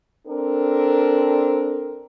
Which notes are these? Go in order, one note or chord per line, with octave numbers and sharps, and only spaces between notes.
C4 D4 A4 A#4